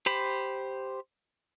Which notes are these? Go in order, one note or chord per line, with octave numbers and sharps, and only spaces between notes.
G4 C5 B5